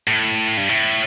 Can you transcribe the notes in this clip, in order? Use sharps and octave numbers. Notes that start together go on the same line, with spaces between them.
A2
G2
A2